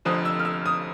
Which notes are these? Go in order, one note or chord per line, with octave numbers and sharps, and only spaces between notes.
F1 F2 D3 F3 D#6
E6
F6
E6
D#6